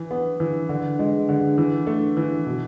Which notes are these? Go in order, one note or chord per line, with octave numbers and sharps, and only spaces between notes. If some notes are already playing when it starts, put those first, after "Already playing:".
Already playing: E3
B3
E3
D3
G#3
D3
E3
A3
E3
B2